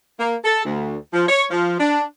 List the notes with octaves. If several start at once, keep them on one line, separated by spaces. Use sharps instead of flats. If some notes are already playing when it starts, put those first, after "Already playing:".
A#3
A4
D2
F3
C#5
F3
D4